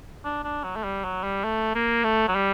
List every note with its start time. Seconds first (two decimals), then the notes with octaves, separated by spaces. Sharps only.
0.24 D4
0.44 D4
0.64 F#3
0.76 A3
0.84 G3
1.04 F#3
1.24 G3
1.44 A3
1.75 A#3
2.04 A3
2.28 F#3
2.35 G3